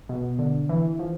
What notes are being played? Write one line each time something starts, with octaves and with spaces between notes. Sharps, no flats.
B2
D3
E3
F3